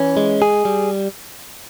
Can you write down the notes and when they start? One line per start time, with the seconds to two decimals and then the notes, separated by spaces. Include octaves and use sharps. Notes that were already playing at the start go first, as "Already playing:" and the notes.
Already playing: E3 C#4
0.17 G#3
0.42 G#4
0.65 G3